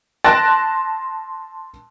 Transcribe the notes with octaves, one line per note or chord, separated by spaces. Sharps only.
A5 C6 F#6 A6 A#6 D7